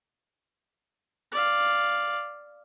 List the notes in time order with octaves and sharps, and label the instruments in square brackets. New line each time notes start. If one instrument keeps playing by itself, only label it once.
[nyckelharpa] D5 F5